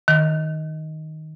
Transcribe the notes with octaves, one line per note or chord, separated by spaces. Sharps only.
D#3